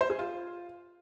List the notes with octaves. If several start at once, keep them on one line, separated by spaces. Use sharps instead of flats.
C5
G#4
F4